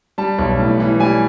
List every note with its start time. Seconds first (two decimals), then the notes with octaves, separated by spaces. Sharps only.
0.18 G3 A5
0.39 B1
0.59 A2
0.80 E3
1.00 G3 G#5